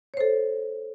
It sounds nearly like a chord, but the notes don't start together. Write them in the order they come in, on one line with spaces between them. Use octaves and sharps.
C#5 C5 A4